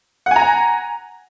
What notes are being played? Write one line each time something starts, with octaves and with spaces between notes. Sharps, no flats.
F#5 G#5 A#5